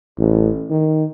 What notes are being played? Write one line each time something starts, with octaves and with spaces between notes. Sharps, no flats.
A1
D#3